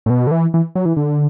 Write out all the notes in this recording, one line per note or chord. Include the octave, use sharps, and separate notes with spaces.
A2
B2
D3
E3
E3
F#3
E3
D3